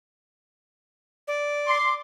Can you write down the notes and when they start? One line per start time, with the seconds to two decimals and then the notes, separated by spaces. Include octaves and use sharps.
1.28 D5
1.67 C6 D6